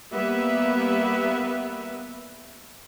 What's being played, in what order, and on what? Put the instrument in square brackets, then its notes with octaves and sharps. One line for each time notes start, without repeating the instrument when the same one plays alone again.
[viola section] G3 A#3 B3 B4 E5